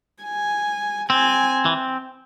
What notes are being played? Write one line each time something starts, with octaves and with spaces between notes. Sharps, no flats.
G#5
C4 G#5
E3